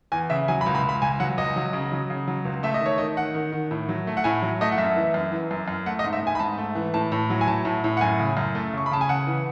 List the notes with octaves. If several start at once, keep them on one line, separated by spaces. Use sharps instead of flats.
E2 G#5
C#3 E5
F#3 G#5
B5
C#2
B5
C#2
B5
C#2 G#5
F#3 F#5
C#2 D#5
F#3
C#3
F#3
C#3
F#3
C#2
A3 E5
D#5
D#3 C#5
D#3 D#5
D#3 F#5
D#3
D#3
A2
F#3
A3
F#5
A2 G#5
F#3
A3 D#5
F#5
F#2 E5
E3
F#2
E3
F#2
F#2
A3 F#5
D#5
G#2
E5
G#2 G#5
B5
G#2 A5
A3
E3
A2 A5
A2
F#3
G#5
A2 A5
A2
A2
F#5
F#2 G#5
C#3
F#2
A3
C#3 C#6
B5
C#3 A5
G#5
C#3 F#5
E3